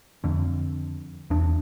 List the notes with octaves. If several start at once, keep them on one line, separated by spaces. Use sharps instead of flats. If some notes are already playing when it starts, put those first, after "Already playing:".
F2 D3
E2 D4